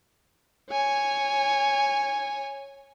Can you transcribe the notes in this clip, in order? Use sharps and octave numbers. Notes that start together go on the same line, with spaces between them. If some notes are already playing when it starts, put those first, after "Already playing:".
C#5 G#5